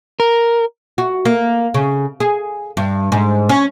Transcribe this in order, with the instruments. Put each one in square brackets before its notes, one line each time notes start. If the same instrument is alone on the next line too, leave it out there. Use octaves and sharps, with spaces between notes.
[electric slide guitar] A#4
[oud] F#4
A#3
C#3
G#4
G2
G#2
C#4